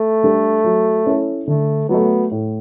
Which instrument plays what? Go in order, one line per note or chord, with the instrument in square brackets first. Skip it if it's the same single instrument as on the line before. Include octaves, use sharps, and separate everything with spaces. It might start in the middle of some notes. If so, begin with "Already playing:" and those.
Already playing: [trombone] A3
[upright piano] G3 D4 A4
F#3
C#4 E4 A4
[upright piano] D3 [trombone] A3
[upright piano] F#3 A3 [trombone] B3
[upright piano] A2